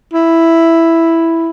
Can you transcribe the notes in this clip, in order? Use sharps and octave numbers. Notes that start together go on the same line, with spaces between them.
E4